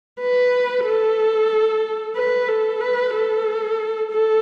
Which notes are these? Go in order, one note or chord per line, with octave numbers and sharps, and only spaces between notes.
B4
A4
B4
A4
B4
A4
A4